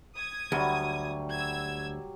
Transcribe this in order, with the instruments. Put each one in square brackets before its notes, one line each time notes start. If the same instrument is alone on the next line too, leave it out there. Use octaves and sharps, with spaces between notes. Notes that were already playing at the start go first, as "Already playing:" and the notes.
[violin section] D#6 G#6
[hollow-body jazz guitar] D2 [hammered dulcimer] F#3 G3
[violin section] E6 G#6